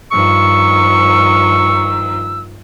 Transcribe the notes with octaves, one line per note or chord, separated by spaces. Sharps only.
G2 D#3 F3 C#6 E6